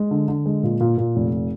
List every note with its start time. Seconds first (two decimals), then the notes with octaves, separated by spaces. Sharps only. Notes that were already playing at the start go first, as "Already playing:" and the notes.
Already playing: G#3
0.11 D3
0.28 D3
0.46 G#3
0.63 A#2
0.80 A#2
0.97 A#2
1.16 F1